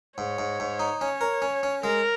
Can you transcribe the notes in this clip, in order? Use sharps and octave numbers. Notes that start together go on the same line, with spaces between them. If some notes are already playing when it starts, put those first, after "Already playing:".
G#2 C#5
G#2
G#2
D#4
C#4 C#5
A#4
C#4
C#4
G#3 A#4